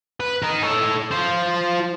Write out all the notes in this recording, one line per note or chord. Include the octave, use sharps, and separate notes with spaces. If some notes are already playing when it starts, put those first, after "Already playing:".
B4
D#4 A#4
A4 C#5
F4 C5